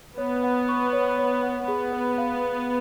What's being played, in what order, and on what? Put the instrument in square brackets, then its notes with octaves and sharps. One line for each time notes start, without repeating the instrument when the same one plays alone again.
[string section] B3 [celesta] C#5
[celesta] F#5
C#6
C#5
C#5
F#5
[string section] B3 [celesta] G#4
[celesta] B4
F5